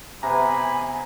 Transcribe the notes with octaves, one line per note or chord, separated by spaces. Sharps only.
C3 B3 G#5 A#5 B5